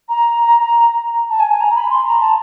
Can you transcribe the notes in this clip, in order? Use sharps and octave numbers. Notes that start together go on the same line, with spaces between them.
A#5
A5
G#5
G#5
A#5
B5
C6
A#5
A5